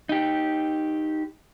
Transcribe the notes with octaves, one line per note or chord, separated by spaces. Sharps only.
D#4 G4